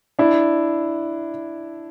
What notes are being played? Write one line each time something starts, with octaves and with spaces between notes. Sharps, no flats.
D4 E4